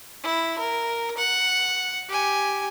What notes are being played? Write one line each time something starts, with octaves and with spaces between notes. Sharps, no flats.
E4
A#4
F#5
G4 G#5